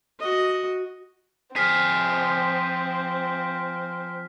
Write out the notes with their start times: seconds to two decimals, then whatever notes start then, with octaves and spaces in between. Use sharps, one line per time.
0.20 F#4 D#5
1.56 F3 C4 G#4 F6 B6